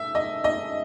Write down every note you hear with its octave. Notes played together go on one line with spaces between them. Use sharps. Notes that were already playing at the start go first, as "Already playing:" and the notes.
Already playing: E5
D#5
D#5